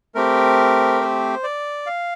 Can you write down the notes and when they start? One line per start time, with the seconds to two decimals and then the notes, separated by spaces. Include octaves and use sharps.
0.15 A3 C4 G4 A#4
1.01 C5
1.43 D5
1.86 F5